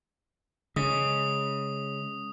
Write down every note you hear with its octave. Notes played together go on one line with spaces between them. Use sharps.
C#3 G#3 D#6